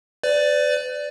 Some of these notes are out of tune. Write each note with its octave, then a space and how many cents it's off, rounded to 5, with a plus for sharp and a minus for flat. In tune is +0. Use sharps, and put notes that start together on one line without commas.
B4 +40 D5 +0